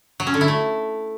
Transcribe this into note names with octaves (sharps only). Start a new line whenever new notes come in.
F#3
C#4
D3
E4
A3